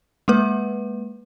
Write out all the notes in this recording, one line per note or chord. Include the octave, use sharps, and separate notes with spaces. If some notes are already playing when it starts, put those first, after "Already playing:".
G#3 A#3 B4